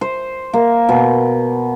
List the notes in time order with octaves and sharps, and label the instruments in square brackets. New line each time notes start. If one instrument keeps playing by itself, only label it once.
[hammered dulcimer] C5
A#3
B2